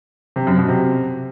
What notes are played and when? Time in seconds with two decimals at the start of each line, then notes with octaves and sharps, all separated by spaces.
0.36 C3
0.47 F#2
0.58 B2
0.69 C3